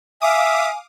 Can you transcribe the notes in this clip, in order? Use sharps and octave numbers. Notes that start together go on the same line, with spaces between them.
E5 F5 G#5 D6 D#6